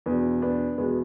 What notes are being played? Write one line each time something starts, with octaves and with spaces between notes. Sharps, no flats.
E2 B2 B3 D4
B3 D4
E2 B2 G#3 B3